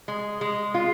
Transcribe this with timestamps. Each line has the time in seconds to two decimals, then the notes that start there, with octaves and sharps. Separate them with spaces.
0.08 G#3
0.41 G#3
0.74 F4